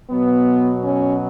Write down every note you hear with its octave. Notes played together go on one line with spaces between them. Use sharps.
B2 F#3 B3
C#4